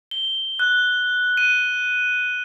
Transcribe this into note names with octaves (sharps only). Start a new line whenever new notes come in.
G7
F#6
D#7